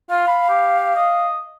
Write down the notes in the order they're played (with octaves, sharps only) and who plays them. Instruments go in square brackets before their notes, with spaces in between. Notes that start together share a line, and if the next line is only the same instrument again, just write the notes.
[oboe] F4 [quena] F5
[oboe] B5
G4
D#5